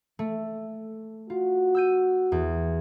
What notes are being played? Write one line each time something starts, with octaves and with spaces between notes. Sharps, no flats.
A3
F4 F#4
E6 G6 D#7
E2